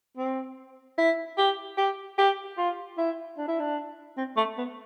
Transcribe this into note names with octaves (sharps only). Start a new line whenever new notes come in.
C4
E4
G4
G4
G4
F4
E4
D4
E4
D4
C4
A3
B3